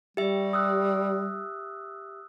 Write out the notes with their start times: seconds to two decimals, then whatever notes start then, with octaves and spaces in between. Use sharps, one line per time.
0.17 G3 G4 E5
0.53 D#6 E6 F#6